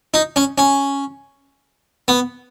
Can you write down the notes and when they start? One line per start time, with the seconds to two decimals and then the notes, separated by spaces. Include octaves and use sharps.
0.14 D#4
0.36 C#4
0.58 C#4
2.08 B3